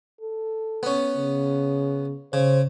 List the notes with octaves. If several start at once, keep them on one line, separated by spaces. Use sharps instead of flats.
A4
B3 C#4
C#3
C#3 C5